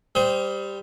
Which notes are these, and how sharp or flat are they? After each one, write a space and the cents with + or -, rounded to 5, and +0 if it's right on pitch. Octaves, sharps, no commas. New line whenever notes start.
G3 +10 C5 -10 D#6 +35